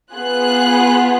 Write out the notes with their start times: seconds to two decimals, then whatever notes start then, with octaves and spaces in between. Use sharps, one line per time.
0.15 B3 F4 G#4 F#6